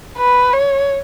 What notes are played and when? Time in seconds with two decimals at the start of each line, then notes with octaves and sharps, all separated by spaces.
0.17 B4
0.53 C#5